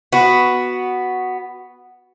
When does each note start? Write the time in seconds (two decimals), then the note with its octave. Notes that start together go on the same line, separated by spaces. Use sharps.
0.13 B3 F#4